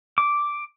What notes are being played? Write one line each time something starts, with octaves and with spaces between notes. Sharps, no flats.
D6